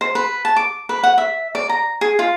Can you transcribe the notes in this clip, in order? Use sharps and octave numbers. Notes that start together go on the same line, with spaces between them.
C5
B4
A5
D6
B4
F#5
E5
D5
A#5
G#4
F4